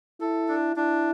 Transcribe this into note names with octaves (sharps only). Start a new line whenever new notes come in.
E4 A4
D4
D4 E4